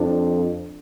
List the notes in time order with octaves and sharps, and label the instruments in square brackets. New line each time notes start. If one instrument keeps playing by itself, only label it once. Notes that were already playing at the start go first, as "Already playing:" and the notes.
Already playing: [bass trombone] F2 [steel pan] D4